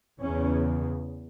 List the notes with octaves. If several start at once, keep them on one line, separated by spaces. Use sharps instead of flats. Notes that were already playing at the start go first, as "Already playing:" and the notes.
E2 C#3 C#4